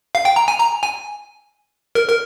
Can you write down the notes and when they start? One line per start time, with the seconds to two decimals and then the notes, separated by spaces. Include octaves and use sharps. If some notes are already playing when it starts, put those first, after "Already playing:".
0.15 F5
0.25 G5
0.36 A#5
0.48 G#5
0.60 A#5
0.83 G#5
1.95 A#4
2.08 A#4